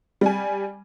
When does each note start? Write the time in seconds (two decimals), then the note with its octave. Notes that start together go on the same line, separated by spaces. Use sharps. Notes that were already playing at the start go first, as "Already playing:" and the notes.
0.21 G3 G#5